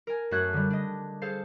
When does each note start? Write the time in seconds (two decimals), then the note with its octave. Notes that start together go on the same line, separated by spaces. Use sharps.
0.07 A#4 G#5
0.31 F#2 A3 F#4 F#6 G#6
0.53 D3 G3
0.70 D4 D#5
1.22 G#4 A4 C5 F5